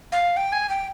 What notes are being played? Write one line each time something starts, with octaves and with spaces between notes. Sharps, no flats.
F5
G5
G#5
G5